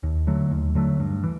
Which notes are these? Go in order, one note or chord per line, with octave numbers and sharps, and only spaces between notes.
D#2
D3 F#3 A3
D#2
D3 F#3 A3
G2
E3